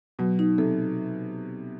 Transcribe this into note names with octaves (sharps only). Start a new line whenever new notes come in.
B2 F#3
D#4
C3 A4